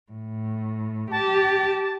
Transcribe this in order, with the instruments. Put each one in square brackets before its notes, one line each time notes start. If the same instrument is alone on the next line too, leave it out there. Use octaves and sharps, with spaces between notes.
[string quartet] A2
[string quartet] G4 [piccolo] A5